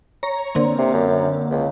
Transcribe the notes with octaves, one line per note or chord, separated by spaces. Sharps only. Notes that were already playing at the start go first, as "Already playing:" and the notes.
C#5 A#5
D3 A#3 C4
C3
F#2
C#2